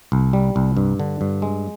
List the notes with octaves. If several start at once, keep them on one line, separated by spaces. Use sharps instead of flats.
C2
G3
C2
G2
D3
G2
G#3